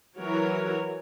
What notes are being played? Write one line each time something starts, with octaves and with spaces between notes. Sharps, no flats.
E3 F#3 F#4 A#4 C#5